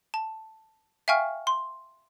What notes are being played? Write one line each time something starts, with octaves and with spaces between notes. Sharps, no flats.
A5
E5 F5 G5 G#5 C#6 F6
C6